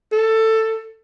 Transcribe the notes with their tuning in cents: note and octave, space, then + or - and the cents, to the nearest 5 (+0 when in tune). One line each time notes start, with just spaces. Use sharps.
A4 +15